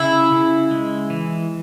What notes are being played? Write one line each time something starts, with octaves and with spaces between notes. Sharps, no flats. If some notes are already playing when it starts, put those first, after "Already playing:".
Already playing: C#3 E4
C#3
G#3
E3